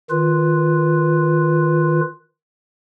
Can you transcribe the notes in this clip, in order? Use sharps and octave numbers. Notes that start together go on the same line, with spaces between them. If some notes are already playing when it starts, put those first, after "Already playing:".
D#3 F4 B4